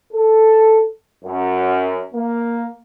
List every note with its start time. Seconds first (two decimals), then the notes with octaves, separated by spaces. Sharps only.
0.13 A4
1.25 F#2
2.14 A#3